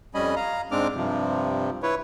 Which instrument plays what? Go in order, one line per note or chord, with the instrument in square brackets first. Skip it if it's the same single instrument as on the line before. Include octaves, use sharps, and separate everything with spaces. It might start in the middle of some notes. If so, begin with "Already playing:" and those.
[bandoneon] F2 G3 C#4 D#5 G#5 B5
F5 A#5
G#2 G#3 C4 D4 D6 F6
G2 C3 F3
E4 B4 C#5